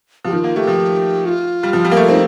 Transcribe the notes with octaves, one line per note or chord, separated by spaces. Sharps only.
F3 G4
D#3 F4
A#3
A3 G4
F3
F4
G3
F3
G3
A#3
A3
C4 D#4